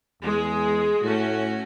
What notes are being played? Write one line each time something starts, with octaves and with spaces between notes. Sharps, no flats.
E2 G#3 G#4
A2 A3 C#4 F#4